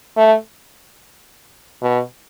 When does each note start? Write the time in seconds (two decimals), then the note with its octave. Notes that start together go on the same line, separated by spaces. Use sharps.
0.16 A3
1.82 B2